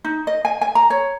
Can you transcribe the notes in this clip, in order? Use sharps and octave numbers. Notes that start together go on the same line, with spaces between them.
D#4
D#5
G#5
G#5
A#5
C#5